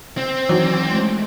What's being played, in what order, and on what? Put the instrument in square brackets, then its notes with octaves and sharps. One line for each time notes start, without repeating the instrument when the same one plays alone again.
[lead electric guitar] C4
[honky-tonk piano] D#3 E3 F#3 [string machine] D5
[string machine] G#3 A3